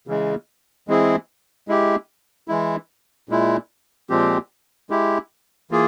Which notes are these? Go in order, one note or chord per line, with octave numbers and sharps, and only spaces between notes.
C#3 E3 G#3
E3 G#3 C4 E4 G#4
G#3 E4 G4
E3 G#3 E4
A#2 G#3 E4
A#2 F3 G#3 C4 G4
G#3 E4 G4
E3 A#3 F4 G#4